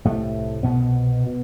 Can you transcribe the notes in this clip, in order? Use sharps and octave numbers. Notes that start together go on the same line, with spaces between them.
C2 A2 C3 A3
B2 B3
B2